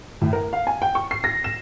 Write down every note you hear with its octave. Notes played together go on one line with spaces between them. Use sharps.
A2
A#4
F5
G#5
G5
C#6
C7
A#6
E7